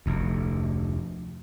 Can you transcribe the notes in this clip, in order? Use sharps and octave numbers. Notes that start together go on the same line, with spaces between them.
F1 D2